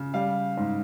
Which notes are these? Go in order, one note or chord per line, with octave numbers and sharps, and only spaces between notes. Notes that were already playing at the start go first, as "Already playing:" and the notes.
Already playing: C#3
G3 F5
G#2